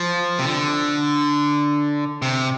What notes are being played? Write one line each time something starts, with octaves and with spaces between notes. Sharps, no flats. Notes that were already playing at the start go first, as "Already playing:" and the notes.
Already playing: F3
C3
D3
C3